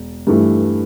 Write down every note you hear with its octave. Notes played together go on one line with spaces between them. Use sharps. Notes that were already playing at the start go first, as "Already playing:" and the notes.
Already playing: E1
G2 E3 A3 E4